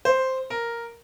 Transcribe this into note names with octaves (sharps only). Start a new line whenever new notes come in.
C5
A#4